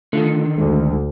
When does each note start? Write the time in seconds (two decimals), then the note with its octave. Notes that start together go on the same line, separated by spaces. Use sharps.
0.13 D3 D#3 A3 F4 A4
0.58 D2 G#3